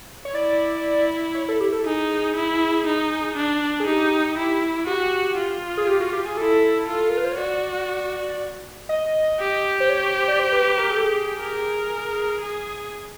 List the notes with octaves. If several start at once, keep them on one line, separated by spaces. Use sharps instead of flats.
C#5
E4 D5
C#5
A4
G4
A4
D#4 G#4
E4
D#4
D4
G#4
D#4 G4
E4
F#4 G4
F4
G#4
G4
F#4
G4
G#4
E4 A4
F4
A#4
B4
C5
C#5
F#4 D5
D#5
G4
C5
C#5
C#5
C5
D5
C5
B4
B4
A#4
G#4
A4
G#4
A#4
G#4